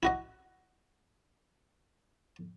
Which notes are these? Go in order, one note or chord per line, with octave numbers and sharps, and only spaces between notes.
E4 F#4 D#5